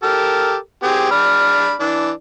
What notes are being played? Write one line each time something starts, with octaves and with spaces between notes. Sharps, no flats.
G4 A4 A#4
C4 G4 G#4
D4 B5 F6
E3 D4